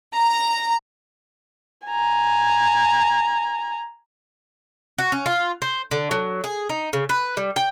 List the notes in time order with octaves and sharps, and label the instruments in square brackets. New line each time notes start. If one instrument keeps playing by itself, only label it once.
[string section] A#5
[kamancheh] G#5 A#5
[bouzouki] F#4
C#4
F4
C5
D3
F#3
G#4
D#4
C#3
B4
G3
G5